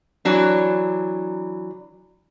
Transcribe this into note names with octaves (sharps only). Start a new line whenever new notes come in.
E3 F#3 D4